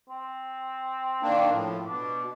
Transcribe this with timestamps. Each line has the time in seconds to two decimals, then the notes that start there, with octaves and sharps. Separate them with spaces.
0.09 C4
1.22 D#3 A#3 D4
1.50 A2 F3
1.86 B2 D4